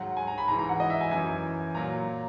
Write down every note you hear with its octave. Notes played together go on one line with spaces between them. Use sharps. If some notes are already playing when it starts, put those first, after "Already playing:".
Already playing: G#2 D#3 F#3 F#5
G#5
A#5
B5
G#2 E3 A#5
A#5
F#5
D#5
E5
G#5
F#2 E3 G#5
A#2 F#3 A#5